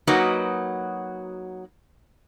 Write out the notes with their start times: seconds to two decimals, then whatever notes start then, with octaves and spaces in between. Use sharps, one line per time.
0.07 F#3 A#3 D#4 F#4 B4 D#5